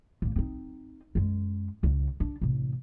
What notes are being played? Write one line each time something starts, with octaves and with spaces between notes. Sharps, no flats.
A1 A#3
C4 D#4
F#2 G#3
C#2 C#3
D4
A1 C3